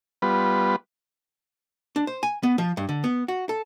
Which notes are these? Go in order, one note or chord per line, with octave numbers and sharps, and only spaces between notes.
G3 B3 F4 B4
D4
C5
G#5
B3
F3
G2
D3
B3
F#4
A4